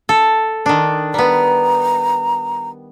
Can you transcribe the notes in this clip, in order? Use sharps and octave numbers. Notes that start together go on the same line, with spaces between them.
A4
D#3 D4
G3 B3 A#5